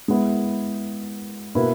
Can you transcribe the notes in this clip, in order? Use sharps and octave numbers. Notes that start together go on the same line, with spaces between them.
G#3 B3 E4
B2 A#3 E4 B4